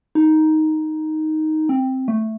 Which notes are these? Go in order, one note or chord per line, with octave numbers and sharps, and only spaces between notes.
D#4
C4
A3